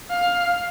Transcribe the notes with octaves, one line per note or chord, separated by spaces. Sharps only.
F5